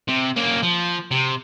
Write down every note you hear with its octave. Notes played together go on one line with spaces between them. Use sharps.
C3
A#3 C#4
F3
C3